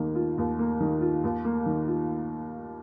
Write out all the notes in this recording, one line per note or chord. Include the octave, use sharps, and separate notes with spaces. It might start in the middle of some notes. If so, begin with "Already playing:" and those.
Already playing: D#2 D#3 A#3
F4
D#2
A#3
D#3
F4
D#2
A#3
D#3
F4